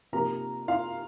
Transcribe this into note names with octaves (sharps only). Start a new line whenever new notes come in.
C3 F3 A#3 D#4 A#4 A#5
F4 F5